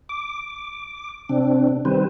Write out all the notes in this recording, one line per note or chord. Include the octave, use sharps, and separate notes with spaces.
D6
C3 C4 D4
D#3 G3 C4 B4 C5